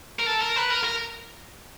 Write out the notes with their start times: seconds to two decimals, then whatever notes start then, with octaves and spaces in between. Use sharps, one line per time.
0.19 A#4
0.27 A4
0.42 A#4
0.57 B4
0.71 A#4
0.84 A#4